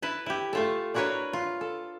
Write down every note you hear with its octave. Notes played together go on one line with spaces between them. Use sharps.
E4 B4 A5
E4 G4
A3 F4 A4
D4 E4 F#4 A#4 B4 C#5
F4
A4